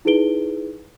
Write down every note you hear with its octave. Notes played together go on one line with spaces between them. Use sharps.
D#4 E4 G#4 B4 D7 G7